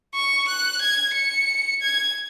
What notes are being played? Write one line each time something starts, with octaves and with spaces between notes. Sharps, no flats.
C#6
F#6
G#6
C#7
G#6